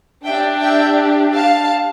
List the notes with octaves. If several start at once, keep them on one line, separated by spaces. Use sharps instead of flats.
D4 G4 E5 G5
E5 G5
F5 A5